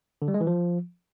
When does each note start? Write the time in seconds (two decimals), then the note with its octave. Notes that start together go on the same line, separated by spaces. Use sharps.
0.22 D3
0.28 G3
0.34 G#3
0.41 E3
0.47 F3